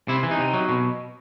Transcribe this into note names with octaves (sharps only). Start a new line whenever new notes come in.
C3 E4
E3
D#4
C3
F#3
B2